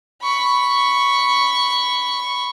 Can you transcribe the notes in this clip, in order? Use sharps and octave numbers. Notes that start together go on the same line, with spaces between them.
B5 C#6